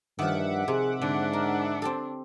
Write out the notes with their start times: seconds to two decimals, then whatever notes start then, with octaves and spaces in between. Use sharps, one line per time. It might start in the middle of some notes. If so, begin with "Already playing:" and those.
0.19 G2 D#3 F3 E5 F#5 D6
0.68 C3 G#4
1.02 G#2 D3 D4
1.33 A#4
1.82 C4 G4 A4